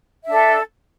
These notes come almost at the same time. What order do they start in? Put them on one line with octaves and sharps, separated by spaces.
E5 D4 A4